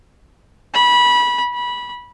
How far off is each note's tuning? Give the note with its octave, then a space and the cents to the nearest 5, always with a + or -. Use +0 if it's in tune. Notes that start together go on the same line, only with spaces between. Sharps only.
B5 -20
B5 -20